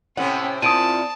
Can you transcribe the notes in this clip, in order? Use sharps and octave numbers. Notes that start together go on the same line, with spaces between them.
A2 C3 C4 C#4 F#5
A#2 C4 E4 F4 A5 D#6 D7 D#7